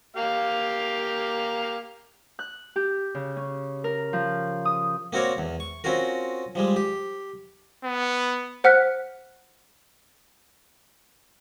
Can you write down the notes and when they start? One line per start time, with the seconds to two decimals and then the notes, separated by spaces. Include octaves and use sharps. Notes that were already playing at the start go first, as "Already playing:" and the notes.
0.16 A#3 G4 F5
2.39 F#6
2.76 G4
3.15 C#3
3.37 C#4
3.84 A#4
4.13 F3
4.65 D#6
5.13 A#3 C4 F#4 A#4 C#5 D5
5.38 E2
5.60 C#6
5.84 C4 C#4 F4 F#4 A#4
6.55 F3 G3 G#3
6.76 G4
7.84 B3
8.64 C5 F#5 F6 F#6 B6